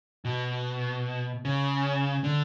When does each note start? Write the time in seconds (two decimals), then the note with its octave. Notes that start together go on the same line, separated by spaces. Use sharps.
0.25 B2
1.45 C#3
2.24 D3